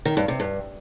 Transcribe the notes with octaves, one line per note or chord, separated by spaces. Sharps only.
D#3
G2
C3
G2